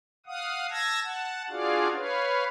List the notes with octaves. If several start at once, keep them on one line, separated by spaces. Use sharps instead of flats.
F5 F#5 D#6
A5 E6 G#6 A#6
F#5 A5
D4 F4 F#4 G#4 D5 F5
B4 C#5 F5